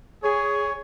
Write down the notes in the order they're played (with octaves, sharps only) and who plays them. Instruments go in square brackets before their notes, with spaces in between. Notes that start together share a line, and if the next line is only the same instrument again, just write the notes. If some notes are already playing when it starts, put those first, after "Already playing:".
[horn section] G#4 [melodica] C#5